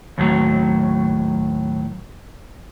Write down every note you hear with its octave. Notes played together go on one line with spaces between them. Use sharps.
D#2 A2 F#3